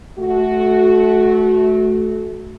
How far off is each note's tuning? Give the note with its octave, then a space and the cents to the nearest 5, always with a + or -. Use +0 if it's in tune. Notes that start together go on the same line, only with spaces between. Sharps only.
A3 -25 F#4 +0